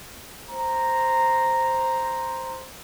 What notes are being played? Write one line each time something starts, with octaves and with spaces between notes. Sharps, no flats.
C5 A#5